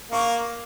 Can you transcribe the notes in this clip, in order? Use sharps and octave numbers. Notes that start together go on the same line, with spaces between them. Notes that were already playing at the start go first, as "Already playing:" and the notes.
A#3 C#6